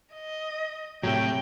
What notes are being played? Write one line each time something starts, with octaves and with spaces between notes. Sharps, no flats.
D#5
A2 C3 F#3 G5